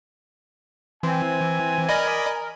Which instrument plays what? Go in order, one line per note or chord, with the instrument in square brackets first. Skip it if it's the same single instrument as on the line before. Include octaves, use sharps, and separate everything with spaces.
[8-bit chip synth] E3 [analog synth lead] C4 [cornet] G#5
[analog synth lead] A#4 [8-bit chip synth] D5 D#5 B5